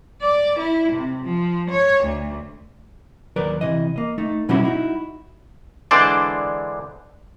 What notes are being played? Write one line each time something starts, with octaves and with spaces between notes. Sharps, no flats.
D5
E4
C3
F3
C#5
D2
D#2 F#3 A#4 B4 D5
C3 E3 D#5
A#3 D#5
A3 D#4 A4
B2 F#3 G3 C#4 E4 F#4
D#4 E4 F#4
D3 E3 G#3 D4 C5 D5